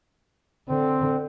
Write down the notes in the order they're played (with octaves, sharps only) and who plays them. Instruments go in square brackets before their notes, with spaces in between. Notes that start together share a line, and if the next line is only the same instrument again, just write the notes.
[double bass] D3 [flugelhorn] C4